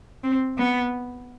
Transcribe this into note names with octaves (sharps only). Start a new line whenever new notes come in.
C4
B3